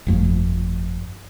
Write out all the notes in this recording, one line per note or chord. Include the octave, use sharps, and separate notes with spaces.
G1 F2 A3